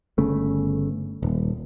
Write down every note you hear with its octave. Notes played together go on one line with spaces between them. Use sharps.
G1 C#3 A3
D#1